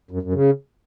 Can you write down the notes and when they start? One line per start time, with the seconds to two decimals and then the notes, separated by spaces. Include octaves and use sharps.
0.11 F#2
0.22 F#2
0.34 C#3